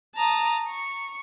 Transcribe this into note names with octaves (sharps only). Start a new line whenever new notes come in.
A5 A#5 D#6
C#6